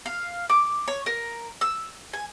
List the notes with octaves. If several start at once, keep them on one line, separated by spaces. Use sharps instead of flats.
F5
D6
C#5
A#4
E6
G#5